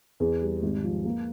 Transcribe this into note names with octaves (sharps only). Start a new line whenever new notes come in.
E2
G3
G#1
F3
A#3